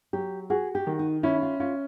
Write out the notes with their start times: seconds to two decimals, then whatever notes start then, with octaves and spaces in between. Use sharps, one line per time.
0.13 F#3 G4
0.50 F#4 G#4
0.75 G4
0.87 D#3
0.99 D#4
1.23 C#4 E4
1.42 F4
1.60 C#4 F4